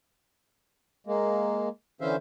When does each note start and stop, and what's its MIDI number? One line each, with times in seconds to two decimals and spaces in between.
1.07 1.69 56
1.07 1.69 58
2.01 2.16 50
2.01 2.16 52
2.01 2.16 61
2.01 2.16 72
2.01 2.16 76
2.01 2.16 77